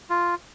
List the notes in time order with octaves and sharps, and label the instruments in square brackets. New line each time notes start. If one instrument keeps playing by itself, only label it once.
[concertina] F4